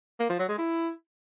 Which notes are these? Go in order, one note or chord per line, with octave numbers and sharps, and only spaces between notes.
A#3
F3
F#3
G#3
E4